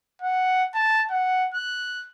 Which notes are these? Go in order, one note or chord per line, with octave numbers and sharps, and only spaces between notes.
F#5
A5
F#5
F#6